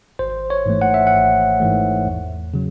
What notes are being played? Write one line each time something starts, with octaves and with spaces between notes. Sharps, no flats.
G#1 C5
C#5
G#2 E3 A3
F#5
E5
F#5
G#1
G#2 E3 A3
E2
C#3 F#3